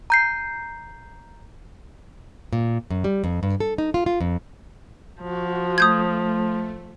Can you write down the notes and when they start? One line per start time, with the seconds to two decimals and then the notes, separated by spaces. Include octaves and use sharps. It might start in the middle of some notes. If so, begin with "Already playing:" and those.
0.10 A#5 G6 C7
2.53 A#2
2.90 F#2
3.04 G3
3.24 F2
3.43 G2
3.60 A4
3.78 D#4
3.94 F4
4.06 F4
4.21 F2
5.23 F3 F#4
5.78 A3 D#6 G6 G#6